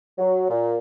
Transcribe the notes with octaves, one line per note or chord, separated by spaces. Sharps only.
F#3
A#2